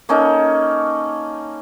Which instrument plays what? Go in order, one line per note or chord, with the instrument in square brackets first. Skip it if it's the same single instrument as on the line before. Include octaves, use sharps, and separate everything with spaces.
[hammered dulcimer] A#3 C#4 D#4 A4